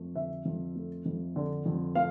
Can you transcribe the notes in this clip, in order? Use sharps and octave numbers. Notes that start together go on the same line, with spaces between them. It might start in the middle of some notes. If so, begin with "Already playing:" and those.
Already playing: F2 A3
D3 E5
F2
A3
F2
D3
F2
A3 F5